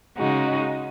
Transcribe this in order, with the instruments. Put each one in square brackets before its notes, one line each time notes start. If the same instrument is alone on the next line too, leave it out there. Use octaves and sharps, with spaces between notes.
[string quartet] C#3 G#3 D#4 F#4